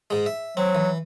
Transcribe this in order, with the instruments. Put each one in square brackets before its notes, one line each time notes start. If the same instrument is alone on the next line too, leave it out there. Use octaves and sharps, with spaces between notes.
[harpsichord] G#2 G#3
E5
[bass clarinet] F#3 [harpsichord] C4
[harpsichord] E3